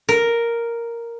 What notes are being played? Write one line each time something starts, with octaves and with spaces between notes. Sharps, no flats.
A#4